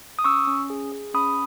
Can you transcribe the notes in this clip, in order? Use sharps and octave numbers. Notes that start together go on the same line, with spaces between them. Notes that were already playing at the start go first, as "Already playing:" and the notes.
D#6
C#4 C#6 E6
C#4
G#4
G#4
C#4 B5 D#6